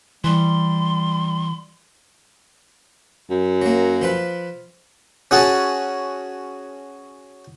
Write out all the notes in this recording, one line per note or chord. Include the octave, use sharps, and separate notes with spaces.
E3 G3 C6
F#2
F#3 A#3
F3 F4 B4
C#4 F#4 G#4 A5